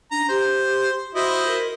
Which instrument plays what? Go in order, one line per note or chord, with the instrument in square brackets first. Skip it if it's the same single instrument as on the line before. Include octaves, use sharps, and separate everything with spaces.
[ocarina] D4 [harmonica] A#5
[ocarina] G4 [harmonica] C5
[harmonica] E4 C5 D#5 [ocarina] F#4
[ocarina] A#4